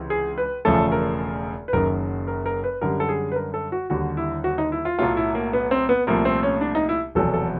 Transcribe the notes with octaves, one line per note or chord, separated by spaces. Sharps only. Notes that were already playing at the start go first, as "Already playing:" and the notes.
Already playing: C#2 C3 E3
G#4
B4
E1 E2 C#3 F3 A3 A4
A#4
B4
F#1 F#2 D#3 A#4
A#4
A#4
B4
F#2 D3 G3 A#4
A4
G#4
B4
A#4
A4
F#4
D#2 D3 G3 F#4
E4
F#4
D#4
E4
F4
B1 A2 F#3 A3 F4
E4
A#3
B3
C4
B3
C2 A#2 F3 A3 A#3
C4
C#4
D4
D#4
E4
F1 E2 B2 F#3 A4
A4